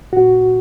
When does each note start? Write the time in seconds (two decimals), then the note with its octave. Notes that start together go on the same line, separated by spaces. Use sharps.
0.13 A#2 F#4